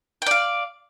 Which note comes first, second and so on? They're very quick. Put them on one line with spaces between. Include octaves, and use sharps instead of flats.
G5 D5 F5